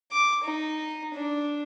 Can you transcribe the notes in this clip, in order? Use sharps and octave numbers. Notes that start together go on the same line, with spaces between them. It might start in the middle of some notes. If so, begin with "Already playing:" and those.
D6
D#4
D4